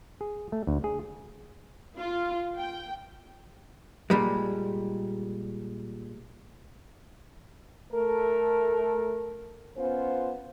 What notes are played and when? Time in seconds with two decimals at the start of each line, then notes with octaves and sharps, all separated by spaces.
0.21 G#4
0.52 A3
0.67 D2
0.84 G#4
1.99 F4
2.57 G5
4.10 A#2 G3 G#3
7.93 A3 A#4
9.77 B3 C#4 F4 C5